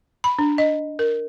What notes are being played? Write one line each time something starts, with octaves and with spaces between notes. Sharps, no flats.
B5
D4
D#5
A#4